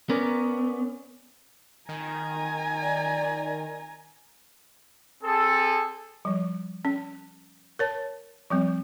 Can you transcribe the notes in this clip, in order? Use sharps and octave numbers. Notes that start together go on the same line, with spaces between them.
B3 C#4 A#4 D5
D#3 G#5 A#5
D5
C4 G#4 A4
F3 G3
C#4
A#4 C#5 A5
F3 G3 C4